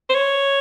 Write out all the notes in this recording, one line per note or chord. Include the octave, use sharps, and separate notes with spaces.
C5
C#5